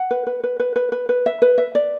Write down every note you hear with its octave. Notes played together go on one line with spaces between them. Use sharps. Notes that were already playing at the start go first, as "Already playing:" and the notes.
Already playing: F#5
B4
B4
B4
B4
B4
B4
B4
E5
B4
E5
D5